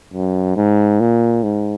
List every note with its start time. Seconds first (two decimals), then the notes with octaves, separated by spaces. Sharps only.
0.14 F#2
0.57 G#2
1.01 A#2
1.44 G#2